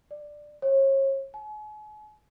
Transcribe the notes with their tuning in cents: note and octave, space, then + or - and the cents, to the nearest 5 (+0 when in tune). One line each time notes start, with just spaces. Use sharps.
D5 +10
C#5 -35
G#5 +40